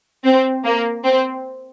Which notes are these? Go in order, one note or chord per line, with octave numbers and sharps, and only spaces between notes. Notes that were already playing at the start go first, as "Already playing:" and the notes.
C4
A#3
C4